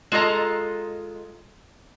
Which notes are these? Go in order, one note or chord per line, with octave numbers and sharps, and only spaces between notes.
G#3 F4 A4 D#5 A#5